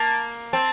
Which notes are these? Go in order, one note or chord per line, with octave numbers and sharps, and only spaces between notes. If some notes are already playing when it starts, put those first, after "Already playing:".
Already playing: A#3 A5
C4 A5